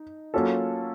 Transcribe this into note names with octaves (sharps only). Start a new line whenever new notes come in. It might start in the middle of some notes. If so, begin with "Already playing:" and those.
Already playing: D#4
F#3 A#3 C#4 F4 A4